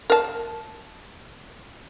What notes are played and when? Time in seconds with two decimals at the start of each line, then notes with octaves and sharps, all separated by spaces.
0.10 A#4 A5